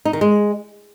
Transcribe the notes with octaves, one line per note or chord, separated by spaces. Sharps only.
D#4
D#3
G#3